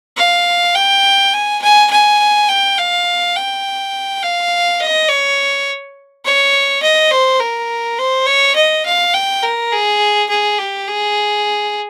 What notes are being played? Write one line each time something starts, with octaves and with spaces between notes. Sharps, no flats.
F5
G5
G#5
G#5
G#5
G5
F5
G5
F5
D#5
C#5
C#5
D#5
C5
A#4
C5
C#5
D#5
F5
G5
A#4
G#4
G#4
G4
G#4